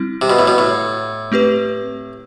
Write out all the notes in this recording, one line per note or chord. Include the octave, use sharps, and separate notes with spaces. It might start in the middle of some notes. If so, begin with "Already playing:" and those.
Already playing: G3 C4 E4
C3
B2
A2
B2
A2
A3 C4 G4 B4